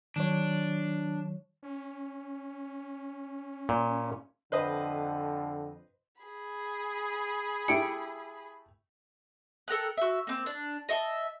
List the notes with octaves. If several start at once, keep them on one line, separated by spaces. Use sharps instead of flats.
D#3 F#3 D4 C#5
C#4
A#2
F2 D3 B4 C5 D#5
G#4 B5
A3 E4 G4 C#7 D7
A4 A#4 G5 F#6
F#4 E5
A#3 C4
D4
D#5 E5 F#5 A5